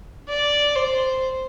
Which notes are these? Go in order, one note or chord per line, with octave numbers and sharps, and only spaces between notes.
D5
C5